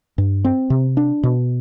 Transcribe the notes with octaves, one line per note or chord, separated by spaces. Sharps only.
G2
C4
C3
D4
B2